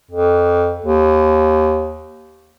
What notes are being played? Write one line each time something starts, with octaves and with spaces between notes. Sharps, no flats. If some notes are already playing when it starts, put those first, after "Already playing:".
F2
D#2